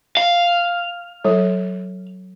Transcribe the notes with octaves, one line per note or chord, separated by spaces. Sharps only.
F5
F#3 A4 C#5